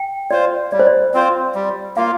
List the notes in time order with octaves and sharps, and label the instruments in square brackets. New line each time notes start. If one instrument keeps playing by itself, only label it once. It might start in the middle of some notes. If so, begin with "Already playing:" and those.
Already playing: [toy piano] G5
[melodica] F4 C5 [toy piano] D5
[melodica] G3 [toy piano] D5
[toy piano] C5
D5
[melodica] C4 F4 C5
G3
[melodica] A#3 F4 [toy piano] F5